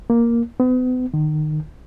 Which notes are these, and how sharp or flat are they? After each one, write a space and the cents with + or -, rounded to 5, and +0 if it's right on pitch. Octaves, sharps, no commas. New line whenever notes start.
A#3 +5
B3 +40
D#3 -25